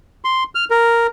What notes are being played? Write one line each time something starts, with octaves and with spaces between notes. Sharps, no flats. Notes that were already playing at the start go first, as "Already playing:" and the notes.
C6
F6
A#4